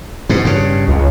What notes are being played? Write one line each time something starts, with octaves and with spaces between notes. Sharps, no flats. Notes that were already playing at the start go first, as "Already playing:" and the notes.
G#2 B2
G2 C#3
C#2